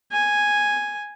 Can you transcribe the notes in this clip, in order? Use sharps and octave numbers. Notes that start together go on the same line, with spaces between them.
G#5